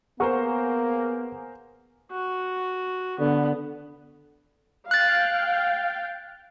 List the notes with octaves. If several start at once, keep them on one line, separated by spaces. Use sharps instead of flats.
A#3 B3 G#4 A#4 C5 F#5 C#6
F#4
D3 B3
F5 G5 F#6 A6